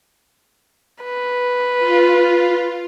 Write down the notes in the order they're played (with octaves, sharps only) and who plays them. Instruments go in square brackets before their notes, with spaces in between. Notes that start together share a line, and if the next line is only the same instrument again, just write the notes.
[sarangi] B4
[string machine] F4